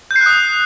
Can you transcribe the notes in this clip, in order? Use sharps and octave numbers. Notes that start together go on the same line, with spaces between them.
G6
C7
F#6
D#6